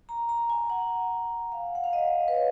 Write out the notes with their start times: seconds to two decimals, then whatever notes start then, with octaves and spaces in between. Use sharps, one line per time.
0.09 A#5
0.29 A#5
0.50 G#5
0.70 F#5
1.52 F5
1.75 F#5
1.84 F5
1.93 D#5
2.28 B4
2.34 C#5